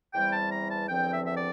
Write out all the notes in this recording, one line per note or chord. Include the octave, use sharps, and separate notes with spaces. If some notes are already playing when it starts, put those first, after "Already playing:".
E2 E3 G3 C4 G5
A5
A#5
A5
E2 D3 F3 C4 G5
E5
E5
D5